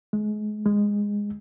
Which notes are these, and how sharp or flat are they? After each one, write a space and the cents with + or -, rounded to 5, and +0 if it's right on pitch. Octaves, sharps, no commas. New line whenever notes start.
G#3 +30
G#3 -15